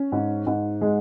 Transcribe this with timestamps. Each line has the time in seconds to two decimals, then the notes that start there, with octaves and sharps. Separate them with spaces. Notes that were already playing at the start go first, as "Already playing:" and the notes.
Already playing: C#4
0.12 G#2
0.47 G#2
0.81 G#3